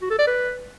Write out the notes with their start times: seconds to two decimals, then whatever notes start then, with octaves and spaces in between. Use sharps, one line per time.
0.02 F#4
0.11 A4
0.19 D5
0.28 B4